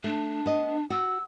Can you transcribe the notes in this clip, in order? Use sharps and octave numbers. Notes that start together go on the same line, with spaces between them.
A3 D4
B3 D#5
F#4 E6